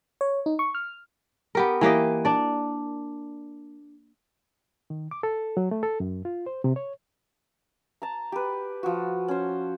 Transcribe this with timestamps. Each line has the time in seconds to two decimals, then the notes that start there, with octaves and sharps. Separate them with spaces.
0.21 C#5
0.46 D#4
0.59 C#6
0.75 F6
1.55 B3 G4 A#4
1.81 E3 A#3 G4 D#5
2.25 D4 D5
4.90 D#3
5.11 D6
5.23 A4
5.57 F#3
5.71 A3
5.83 A4
6.00 F#2
6.25 F4
6.46 C5
6.64 C3
6.76 C#5
8.02 A5 A#5
8.32 G4 B4
8.83 F3 F#4
9.28 C#4 C5